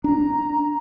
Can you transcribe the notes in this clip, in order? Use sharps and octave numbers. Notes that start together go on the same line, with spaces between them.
D4 A#5